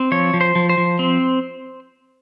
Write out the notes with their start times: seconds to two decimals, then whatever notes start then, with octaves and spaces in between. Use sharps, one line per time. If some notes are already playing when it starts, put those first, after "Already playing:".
Already playing: C4
0.12 F3 C#5
0.34 F3
0.41 C5
0.55 F3
0.69 C5
0.78 F3
0.99 C4